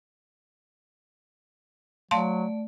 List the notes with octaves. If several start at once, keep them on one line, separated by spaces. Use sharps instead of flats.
F#3 A3 D5 F5 A5 C6